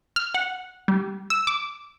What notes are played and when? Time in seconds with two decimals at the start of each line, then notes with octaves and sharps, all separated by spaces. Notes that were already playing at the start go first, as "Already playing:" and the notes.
0.16 F6
0.34 F#5
0.88 G3
1.30 E6
1.47 D6